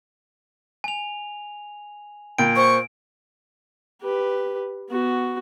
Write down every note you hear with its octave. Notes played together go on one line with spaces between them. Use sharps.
G#5 F7
A#2 G5 D7
C5 C#6
G4 B4
B3 F#4